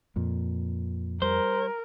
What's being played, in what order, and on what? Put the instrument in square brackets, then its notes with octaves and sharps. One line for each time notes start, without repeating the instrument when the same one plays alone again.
[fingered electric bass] F2 [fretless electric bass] A#2
[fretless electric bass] G3 [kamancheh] A#4 [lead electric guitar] C5